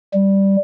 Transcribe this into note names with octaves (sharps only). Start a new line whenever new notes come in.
G3